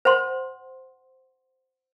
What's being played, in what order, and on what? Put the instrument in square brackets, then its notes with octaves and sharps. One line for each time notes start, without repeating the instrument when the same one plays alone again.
[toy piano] C5 F#5 C6